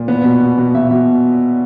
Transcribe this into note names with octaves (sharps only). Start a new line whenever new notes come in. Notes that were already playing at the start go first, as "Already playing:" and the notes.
Already playing: A#2
B3
B2
B2
B2
B2 E5
B2